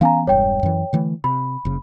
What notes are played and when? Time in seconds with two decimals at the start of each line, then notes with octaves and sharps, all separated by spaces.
0.01 E3 B3 C#4 F5 G#5 A#5
0.27 E1 G2 C#5 G5
0.63 F#2 E3
0.93 D3 E3 A3
1.24 C3 B5
1.65 F#1 C#3